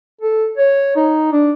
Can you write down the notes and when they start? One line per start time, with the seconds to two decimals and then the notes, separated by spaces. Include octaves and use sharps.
0.21 A4
0.58 C#5
0.96 D#4
1.32 D4